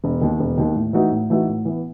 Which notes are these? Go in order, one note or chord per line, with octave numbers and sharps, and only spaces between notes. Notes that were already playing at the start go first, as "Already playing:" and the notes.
E1
D#2 D#3
E1
D#2 D#3
A2
E3 A3 D#4 F#4
A2
E3 A3 D#4 F#4
A2
E3 B3